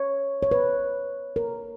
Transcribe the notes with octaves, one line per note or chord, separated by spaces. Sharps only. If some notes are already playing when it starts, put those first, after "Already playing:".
Already playing: C#5
C#5
B4
A#4